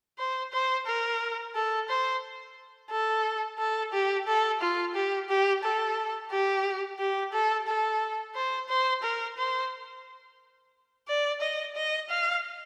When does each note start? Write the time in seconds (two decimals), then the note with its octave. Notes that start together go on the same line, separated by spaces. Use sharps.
0.19 C5
0.53 C5
0.87 A#4
1.55 A4
1.89 C5
2.91 A4
3.59 A4
3.93 G4
4.27 A4
4.61 F4
4.95 G4
5.29 G4
5.64 A4
6.31 G4
6.99 G4
7.33 A4
7.67 A4
8.35 C5
8.69 C5
9.03 A#4
9.38 C5
11.08 D5
11.41 D#5
11.76 D#5
12.10 F5